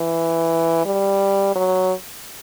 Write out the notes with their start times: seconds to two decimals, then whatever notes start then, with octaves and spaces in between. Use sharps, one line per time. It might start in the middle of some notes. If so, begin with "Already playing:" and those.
Already playing: E3
0.86 G3
1.56 F#3